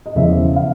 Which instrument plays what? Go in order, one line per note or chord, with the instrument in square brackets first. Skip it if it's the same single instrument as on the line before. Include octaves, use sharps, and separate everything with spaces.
[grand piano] D#5
E1 E2 C#3 F3 E5
F5